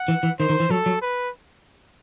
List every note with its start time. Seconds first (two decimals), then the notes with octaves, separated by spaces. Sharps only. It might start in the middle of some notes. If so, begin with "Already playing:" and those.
Already playing: F#5
0.08 E3
0.23 E3
0.39 D#3 C5
0.49 D#3
0.60 E3
0.70 F#3 A4
0.86 F#3
1.02 B4